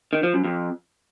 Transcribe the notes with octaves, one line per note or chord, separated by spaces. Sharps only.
D#3
F3
F#2
F2